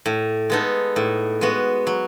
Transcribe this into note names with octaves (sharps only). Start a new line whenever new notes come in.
A2
G#3 B3 D#4 A4
A2
G#3 B3 F#4
F#3